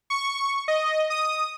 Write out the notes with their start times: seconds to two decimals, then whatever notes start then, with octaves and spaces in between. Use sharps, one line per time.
0.10 C#6
0.68 D#5
1.10 D#6